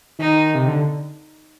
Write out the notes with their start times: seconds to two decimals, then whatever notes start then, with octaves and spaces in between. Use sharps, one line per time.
0.19 D#3 D#4
0.55 C3
0.68 D3